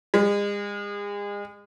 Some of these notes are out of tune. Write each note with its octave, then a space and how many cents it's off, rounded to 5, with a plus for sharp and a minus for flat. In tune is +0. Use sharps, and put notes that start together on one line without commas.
G#3 -35